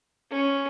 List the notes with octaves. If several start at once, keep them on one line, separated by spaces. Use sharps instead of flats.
C#4